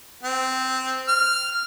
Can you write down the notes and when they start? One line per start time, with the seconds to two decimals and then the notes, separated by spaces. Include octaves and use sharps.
0.23 C4
1.08 F6